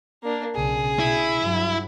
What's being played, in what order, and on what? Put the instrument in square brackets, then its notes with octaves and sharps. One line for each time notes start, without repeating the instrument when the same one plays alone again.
[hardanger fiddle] A#3 D4
[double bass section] B1 C#3 [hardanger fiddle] G#4
[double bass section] B2 [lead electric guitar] E4
[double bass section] G2 F#3